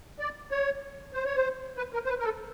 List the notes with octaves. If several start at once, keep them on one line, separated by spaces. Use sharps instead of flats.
D5
C#5
C5
C#5
C5
B4
A#4
C5
B4
A#4
A4